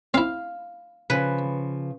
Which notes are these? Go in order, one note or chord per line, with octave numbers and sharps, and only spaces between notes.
C4 E4 F5
C#3 F3 B4